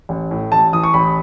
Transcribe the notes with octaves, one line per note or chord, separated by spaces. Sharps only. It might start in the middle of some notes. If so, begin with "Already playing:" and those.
A1
A2
A1 A5
E3 D#6
C#6
A1 B5